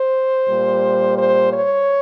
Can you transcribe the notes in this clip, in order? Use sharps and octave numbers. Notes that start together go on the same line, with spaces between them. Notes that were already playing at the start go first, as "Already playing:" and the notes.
Already playing: C5
A#2 G3
C5
C#5